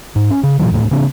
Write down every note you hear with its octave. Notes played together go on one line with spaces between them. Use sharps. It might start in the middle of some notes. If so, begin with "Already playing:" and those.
G#2
C#4
C#3
A#2 D3 E3 F#3
E1 D#2 A2 A3
C#3 A#3 C4 D4